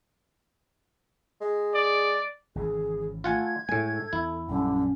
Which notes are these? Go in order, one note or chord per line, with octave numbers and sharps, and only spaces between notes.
G#3
D5
G#1 C#3 E3 G#4
A3 F4 F#5 G#5 G#6
A2 G#3 A4 G#5
E2 E4
A#1 F#2 D3 G3 C#4